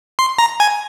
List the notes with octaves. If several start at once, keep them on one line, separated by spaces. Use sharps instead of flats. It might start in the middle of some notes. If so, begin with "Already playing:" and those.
C6
A#5
G#5